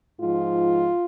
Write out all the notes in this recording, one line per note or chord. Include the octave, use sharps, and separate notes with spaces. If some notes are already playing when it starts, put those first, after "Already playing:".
G#2 F3 F4